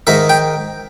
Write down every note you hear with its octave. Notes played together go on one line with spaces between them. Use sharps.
G#2 D#3 E5
G5